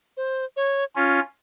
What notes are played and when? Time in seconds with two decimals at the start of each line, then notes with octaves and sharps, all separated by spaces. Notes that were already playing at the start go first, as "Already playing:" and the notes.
0.17 C5
0.57 C#5
0.96 C#4 F4